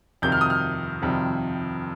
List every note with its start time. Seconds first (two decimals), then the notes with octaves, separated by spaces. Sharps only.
0.22 F2 C3 D#3 G3 G6
0.32 F6
0.41 D#6
0.50 F6
1.02 F2 C3 D#3 G3